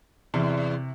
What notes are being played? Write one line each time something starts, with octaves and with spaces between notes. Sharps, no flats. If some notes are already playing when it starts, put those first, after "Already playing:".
E2 C3